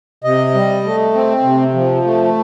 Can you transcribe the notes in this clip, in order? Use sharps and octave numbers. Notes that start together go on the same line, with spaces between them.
C3 D#5
G3
A3
C4
C3
F3
A3